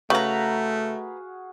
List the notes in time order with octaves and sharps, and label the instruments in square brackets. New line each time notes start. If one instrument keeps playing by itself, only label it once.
[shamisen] C#3 [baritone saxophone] A3 [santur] F#4 G#4 F5 [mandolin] B4 A#5